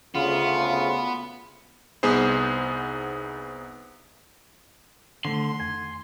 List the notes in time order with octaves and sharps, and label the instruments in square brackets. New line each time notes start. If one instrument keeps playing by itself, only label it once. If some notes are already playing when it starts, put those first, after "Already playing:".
[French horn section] D2 C#3 [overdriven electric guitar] B3 [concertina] F4
[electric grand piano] C2 B3 D#4 G#4 C5
[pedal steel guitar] D3 [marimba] D#3 A3 [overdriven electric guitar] C6
[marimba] F2 [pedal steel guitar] G#5